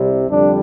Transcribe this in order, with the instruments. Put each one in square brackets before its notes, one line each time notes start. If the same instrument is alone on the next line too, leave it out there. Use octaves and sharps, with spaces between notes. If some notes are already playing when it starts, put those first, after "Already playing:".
Already playing: [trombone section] C2 C3 G3
F2 D3 G3 D4